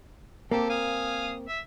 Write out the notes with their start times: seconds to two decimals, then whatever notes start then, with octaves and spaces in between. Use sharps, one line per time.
0.51 A#3 C4 G4 A4
0.70 F5 G#5 D#6
1.48 E5